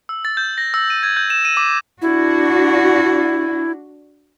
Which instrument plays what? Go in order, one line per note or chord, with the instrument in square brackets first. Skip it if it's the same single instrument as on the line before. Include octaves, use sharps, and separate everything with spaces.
[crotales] E6
A6
G6
A#6
E6
D#7
G#6
G6
E7
D#7
D6
[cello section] D4 F#4 [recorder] E4